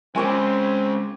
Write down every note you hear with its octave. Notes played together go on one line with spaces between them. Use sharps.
G#3 C4 C#4 G#5 C#6 D6